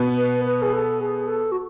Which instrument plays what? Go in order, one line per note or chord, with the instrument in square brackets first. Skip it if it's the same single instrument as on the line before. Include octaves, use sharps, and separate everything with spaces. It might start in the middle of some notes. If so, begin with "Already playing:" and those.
Already playing: [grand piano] B2 B3
[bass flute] B4
B4
G#4
A4
G#4
A4
F#4